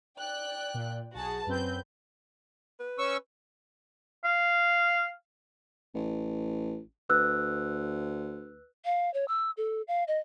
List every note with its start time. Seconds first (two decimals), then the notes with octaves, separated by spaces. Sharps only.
0.19 D5 G5 F#6
0.74 A#2
1.15 B1 F#4 G#4 A5
1.47 F#2 C4 B4 G6
2.80 B4
2.99 C#4 C#6 E6
4.24 F5
5.95 A1
7.09 D2 B4 E6 F#6
8.85 F5
9.14 C#5
9.28 E6
9.57 A4
9.88 F5
10.08 D#5